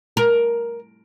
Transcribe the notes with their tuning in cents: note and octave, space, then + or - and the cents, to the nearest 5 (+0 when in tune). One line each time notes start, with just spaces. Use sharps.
A#4 +10